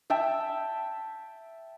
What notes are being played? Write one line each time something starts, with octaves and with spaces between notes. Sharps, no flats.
E5 G5 A5